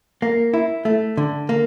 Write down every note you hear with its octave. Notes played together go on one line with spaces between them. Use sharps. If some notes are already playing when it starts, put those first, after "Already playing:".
A#3
E4
A3
D3
A#3